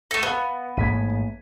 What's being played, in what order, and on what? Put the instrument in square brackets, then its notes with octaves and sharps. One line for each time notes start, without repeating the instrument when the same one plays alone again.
[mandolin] A3 A4 [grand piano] A#6 C#7 D#7
[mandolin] B3 [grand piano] B4 F5 F#5
[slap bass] A1 G#2 A#3 [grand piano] G#6 B6 D#7